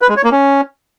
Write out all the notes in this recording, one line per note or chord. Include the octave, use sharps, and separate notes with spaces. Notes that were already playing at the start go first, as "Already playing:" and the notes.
B4
G#3
C#5
A#3
C#4